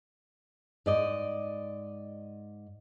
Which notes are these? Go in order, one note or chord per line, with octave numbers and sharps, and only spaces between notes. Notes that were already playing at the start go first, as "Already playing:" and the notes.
G#2 D5 D#5